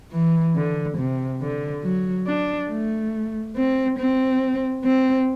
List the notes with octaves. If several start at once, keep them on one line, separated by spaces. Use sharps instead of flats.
E3
D3
C3
D3
F#3
D4
A3
C4
C4
C4